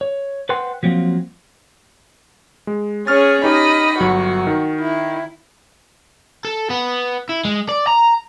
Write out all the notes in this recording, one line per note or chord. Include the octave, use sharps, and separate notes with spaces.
C#5
B4 C5 F#5 G5 C6
F3 F#3 A#3 C4
G#3
C#4 G#4 C#5 C#6 F6 A6
D#4 G4 D#5 B5
G1 F#3 F#4
D#3
E4
A4
B3
E4
G#3
D5
A#5